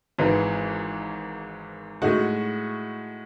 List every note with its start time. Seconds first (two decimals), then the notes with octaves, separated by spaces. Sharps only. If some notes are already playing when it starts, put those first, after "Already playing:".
0.18 G#1 G#2 E3
2.02 A2 G#3 D#4 F#4